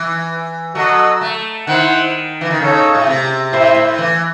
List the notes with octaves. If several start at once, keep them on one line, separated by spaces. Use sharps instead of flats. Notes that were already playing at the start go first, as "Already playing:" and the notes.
Already playing: E3
F#3 F#4 A4 D#5 F#5
A3
D#3 E4 C5 F#5
E3
D#3
C#3 D#4 A4 C#5
A2
C3
A2 E4 C5 E5
A2
E3